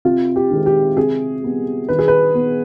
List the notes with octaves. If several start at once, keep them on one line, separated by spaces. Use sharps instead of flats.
C3 F4
G4
D#3 G#3 C4
G4
C3 G#4
G3 B3
D#3 B4
G#4
B4
B3